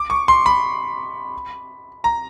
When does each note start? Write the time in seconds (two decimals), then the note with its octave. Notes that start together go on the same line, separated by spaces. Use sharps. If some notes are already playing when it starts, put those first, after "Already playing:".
Already playing: D6
0.10 C#6
0.28 C6
0.46 B5
2.04 A#5